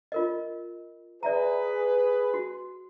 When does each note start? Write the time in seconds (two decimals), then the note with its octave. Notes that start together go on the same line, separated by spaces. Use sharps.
0.12 F4 A#4 D#5
1.23 G#4 B4 D5 E5 A#5
2.34 F#4